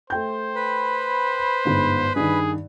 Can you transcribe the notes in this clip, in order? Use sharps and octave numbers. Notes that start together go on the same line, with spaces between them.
A3 C5 G5 G6
B4 B5
G1 G#2
G2 D#3 G#4